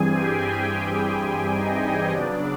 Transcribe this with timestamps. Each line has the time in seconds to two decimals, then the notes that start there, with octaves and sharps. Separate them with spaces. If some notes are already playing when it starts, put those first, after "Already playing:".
Already playing: G2 E3 G3 C4 G#4 G#5
0.14 G4 G5
1.55 D#4 D#5
2.11 C#3 F#3 B3 D4 D5